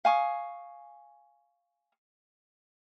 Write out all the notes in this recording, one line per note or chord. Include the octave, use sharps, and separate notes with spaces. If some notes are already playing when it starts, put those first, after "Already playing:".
F5 G#5 C#6 D#6